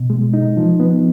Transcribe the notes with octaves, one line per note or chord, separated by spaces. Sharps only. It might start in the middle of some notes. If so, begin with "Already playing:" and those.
Already playing: B2
G#3
D#4
F3
B3